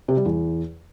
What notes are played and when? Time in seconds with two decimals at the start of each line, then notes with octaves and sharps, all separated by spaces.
0.08 C3
0.17 G3
0.25 E2